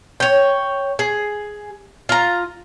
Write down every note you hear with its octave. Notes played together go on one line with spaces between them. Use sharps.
C#5 G5
G#4
F4 A#5